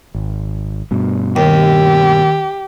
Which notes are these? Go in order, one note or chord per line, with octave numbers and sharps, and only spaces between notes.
G#1
G2 B2
D#2 G4